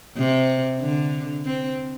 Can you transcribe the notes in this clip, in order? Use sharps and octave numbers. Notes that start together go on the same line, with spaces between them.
C3
D3
C4